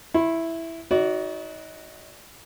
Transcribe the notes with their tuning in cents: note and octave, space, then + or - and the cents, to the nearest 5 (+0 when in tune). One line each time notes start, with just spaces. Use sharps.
E4 +0 C6 +45
D#4 +30 F#4 +0 D5 -30